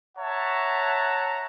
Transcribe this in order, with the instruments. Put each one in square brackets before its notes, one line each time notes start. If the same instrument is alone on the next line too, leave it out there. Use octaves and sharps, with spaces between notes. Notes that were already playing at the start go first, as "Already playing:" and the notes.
[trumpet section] C#5 E5 F#5 A5 A#5